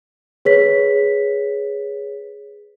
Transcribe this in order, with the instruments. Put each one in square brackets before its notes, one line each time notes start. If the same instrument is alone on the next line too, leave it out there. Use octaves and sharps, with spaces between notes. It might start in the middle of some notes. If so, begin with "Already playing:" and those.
[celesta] G#4 B4 C#5 B6